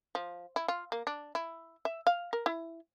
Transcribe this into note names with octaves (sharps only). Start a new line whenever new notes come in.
F3
E4
F4
A#3
D4
E4
E5
F5
A#4
E4